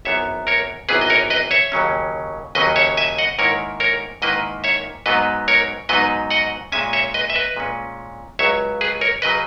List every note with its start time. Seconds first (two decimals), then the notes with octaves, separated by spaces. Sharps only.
0.05 G#1 F#2 E3 B3 C#5 E5
0.47 A#4 C#5
0.89 G#1 F#2 E3 B3 G#4 B4
1.01 D#5
1.10 A#4 C#5
1.30 B4 D#5
1.51 C#5 E5
1.72 D#2 C#3 F#3 C#4
2.55 D#2 C#3 F#3 C#4 B4 D#5
2.76 C#5 E5
2.97 E5 G#5
3.18 D#5 F#5
3.39 G#2 D#3 A#3 E4 A#4 C#5
3.80 A#4 C#5
4.22 G#2 D#3 A#3 E4 B4 D#5
4.64 C#5 E5
5.06 G#2 F#3 B3 D#4 B4 D#5
5.48 A#4 C#5
5.89 G#2 F#3 B3 D#4 B4 D#5
6.31 D#5 F#5
6.72 A#2 G#3 C#4 E5 G#5
6.93 C#5 E5
7.14 B4 D#5
7.30 E5
7.35 B4 D#5
7.56 A#2 G#3 C#4
8.39 C#2 C#3 F#3 C#5 E5
8.81 G#4 B4
9.01 A#4 C#5
9.22 C#3 F#3 B4 D#5